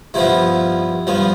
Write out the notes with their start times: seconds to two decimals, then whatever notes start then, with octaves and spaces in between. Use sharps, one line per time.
0.14 G2 F3 B3 E4
1.07 G2 F3 B3